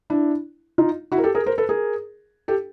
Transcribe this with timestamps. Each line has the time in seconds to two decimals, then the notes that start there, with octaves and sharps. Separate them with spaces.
0.10 D4 E4
0.78 D#4 F4
1.12 E4 F#4
1.18 A#4
1.23 G4 A4
1.35 G#4 A#4
1.46 A#4 C5
1.58 A4 B4
1.69 G#4 A#4
2.48 G4 A4